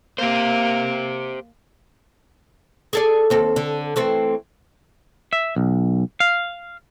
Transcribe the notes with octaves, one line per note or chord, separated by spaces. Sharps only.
A#3 G4 C5
G#4 A4 D5
D#2 C4 A4
D3
E3 A3 C4
E5
B1
F5